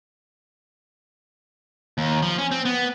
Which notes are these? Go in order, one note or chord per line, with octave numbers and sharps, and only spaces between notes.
D#2
F3
C#4
C4
B3